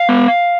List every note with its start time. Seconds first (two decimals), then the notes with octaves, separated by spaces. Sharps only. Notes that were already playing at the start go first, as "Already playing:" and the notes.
Already playing: F5
0.09 B3